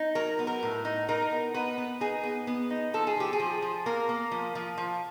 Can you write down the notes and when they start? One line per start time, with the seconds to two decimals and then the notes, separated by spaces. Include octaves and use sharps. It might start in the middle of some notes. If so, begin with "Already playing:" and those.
Already playing: D#4
0.15 F#3 A#4
0.39 B3
0.47 A#4
0.63 A2
0.85 D#4
1.09 D#4 A#4
1.31 B3
1.54 B3 B4
1.78 B3
2.00 D#4 G#4
2.23 B3
2.47 B3
2.70 D#4
2.93 F3 A4
3.07 G#4
3.16 F3 G4
3.33 G#4
3.40 F3
3.62 F3
3.86 A#3 A#4
4.09 A#3
4.31 F3
4.55 F3
4.78 F3